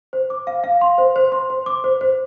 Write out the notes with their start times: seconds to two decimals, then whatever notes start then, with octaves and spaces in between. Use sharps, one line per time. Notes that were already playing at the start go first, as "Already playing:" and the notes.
0.13 C5
0.30 D6
0.47 F5
0.64 F5
0.81 C6
0.98 C5
1.16 C5
1.32 C6
1.50 C5
1.66 D6
1.84 C5
2.01 C5